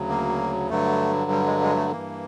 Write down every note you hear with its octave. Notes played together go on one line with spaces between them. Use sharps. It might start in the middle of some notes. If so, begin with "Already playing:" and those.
Already playing: D2 C#3 F#3
A#3
G2 D3 F#3 A3
G3
G#3
G#3
A3
G2 E3 A#3